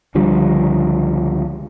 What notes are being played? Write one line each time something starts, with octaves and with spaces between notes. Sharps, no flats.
C#2 D3 F3 G3